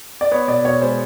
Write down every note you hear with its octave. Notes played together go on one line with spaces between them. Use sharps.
D5
B3 C#5
B2 D5
B2 C#5
G#3 C5